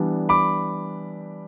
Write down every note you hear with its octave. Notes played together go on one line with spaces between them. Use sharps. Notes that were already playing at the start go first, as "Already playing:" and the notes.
Already playing: E3 G3 B3 D4
B5 D6